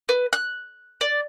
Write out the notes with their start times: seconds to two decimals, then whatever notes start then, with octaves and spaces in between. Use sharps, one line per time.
0.09 B4
0.33 F#6
1.01 D5